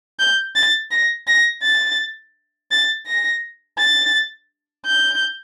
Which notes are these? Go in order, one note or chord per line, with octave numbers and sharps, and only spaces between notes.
G6
A6
A#6
A#6
A6
A6
A#6
A6
G6